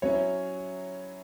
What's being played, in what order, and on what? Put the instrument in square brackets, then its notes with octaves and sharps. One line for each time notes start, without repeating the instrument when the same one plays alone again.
[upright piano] F#3 C#4 E4 [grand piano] C#5